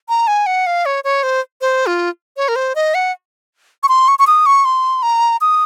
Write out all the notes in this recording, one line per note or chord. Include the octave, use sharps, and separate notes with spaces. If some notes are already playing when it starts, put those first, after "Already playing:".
A#5
G#5
F#5
F5
C#5
C#5
C5
C5
F4
C#5
A#4
C5
D#5
F#5
C#6
C6
C#6
C#6
D#6
C#6
C6
A#5
D#6